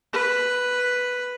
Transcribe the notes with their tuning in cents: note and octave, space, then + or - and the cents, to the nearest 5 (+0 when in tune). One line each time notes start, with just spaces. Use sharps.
B4 +0